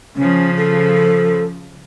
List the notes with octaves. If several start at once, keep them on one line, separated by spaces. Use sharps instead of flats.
C#3 F3 C#4
A4